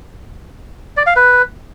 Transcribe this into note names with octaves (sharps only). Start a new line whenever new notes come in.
D5
F5
B4